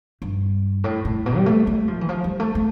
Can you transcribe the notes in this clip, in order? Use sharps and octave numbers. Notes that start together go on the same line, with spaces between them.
G2
A2
A2
B2
G3
A3
A3
F3
E3
F3
G3
A3
A3